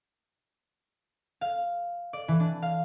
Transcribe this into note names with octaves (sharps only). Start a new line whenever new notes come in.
F5
D5
E3
D4
F5